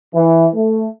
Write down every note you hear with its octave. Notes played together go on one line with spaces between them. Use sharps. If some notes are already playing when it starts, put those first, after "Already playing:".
E3
A3